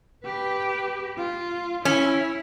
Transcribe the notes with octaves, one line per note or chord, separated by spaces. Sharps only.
G4 B4
F4
C#4 E4